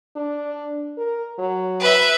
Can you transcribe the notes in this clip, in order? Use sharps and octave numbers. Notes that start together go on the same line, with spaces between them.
D4
A#4
F#3
B4 E5